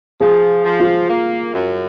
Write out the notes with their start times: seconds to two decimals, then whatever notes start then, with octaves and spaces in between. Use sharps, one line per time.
0.20 F3 G#4
0.65 F3
0.80 F4
1.09 A#3
1.53 F#2